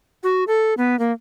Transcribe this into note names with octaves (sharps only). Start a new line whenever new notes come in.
F#4
A4
B3
A#3